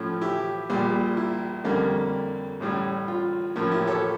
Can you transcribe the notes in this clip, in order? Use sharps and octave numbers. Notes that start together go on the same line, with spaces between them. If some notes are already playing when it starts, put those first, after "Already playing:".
Already playing: A2 F3 A3 C#4
E4 G4
A#1 A#2 G3
E4
F2 D3 G3 A#3 C#4
A1 A2 G3 C#4
F4
A2 F3 A#3 C#4 F4
E4 G4
A4 C#5